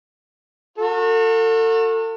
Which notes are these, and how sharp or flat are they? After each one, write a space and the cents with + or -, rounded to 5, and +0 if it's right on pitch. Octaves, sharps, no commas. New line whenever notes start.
F#4 -35 A4 +35